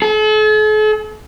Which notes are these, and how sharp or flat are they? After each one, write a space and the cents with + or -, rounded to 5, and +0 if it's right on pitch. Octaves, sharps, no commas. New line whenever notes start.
A4 -45